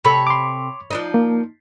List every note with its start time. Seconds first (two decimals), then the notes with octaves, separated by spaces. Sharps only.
0.05 C3 A4 C#5 B5
0.27 C6 D6
0.91 F3 D4 D#4
1.14 A#3